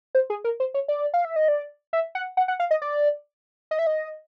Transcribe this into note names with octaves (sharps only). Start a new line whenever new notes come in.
C5
G#4
A#4
C5
C#5
D5
F5
E5
D#5
D5
E5
F#5
F#5
F#5
F5
D#5
D5
D#5
E5
D#5